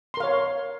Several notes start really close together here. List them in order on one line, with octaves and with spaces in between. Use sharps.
C6 A#4 F5 C#5